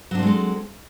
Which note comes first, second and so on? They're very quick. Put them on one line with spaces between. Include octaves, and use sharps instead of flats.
F#3 D4 C4 G#3 A4